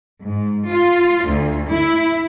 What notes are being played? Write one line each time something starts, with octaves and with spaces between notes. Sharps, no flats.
G#2
F4
D2
E4